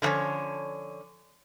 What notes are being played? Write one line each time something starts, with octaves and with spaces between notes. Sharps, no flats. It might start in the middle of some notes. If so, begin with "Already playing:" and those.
D3 F3 B3 C#4 C#5